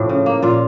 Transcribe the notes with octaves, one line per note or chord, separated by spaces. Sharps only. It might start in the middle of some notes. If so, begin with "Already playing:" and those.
Already playing: A2 F3 G4 A4
C#3
A#3
A#2 F4